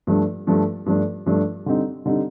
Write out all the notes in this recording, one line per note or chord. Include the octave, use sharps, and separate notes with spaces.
G2 F3 A3 D4
G2 F3 A3 D4
G2 F3 A3 D4
G2 F3 A3 D4
D3 G3 C4 D#4
D3 G3 C4 D#4